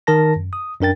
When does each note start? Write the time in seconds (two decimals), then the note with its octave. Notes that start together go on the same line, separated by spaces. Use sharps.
0.07 D#3 A#4 A5 A#6
0.36 F#2
0.53 D#6
0.81 F#2 D4 A#4 G5 A6